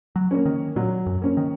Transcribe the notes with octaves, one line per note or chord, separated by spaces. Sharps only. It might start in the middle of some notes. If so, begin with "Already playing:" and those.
F#3
A#3 C#4
D#3
A#2 F#3
F#2
A#3 C#4
D#3